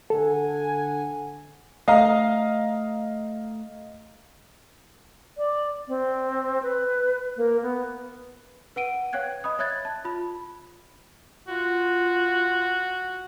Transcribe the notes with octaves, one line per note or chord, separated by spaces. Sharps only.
D3 A4 F#5 G#5
A3 D#5 F5 A#5
D5
C4
B4
A#3
B3
B4 F#5 D7 D#7
C#5 F5 G5 F#6 G#6
D#5 B5 D#6
C#5 E5 F#6 G#6 A6
A5
F4 B5
F4 F#4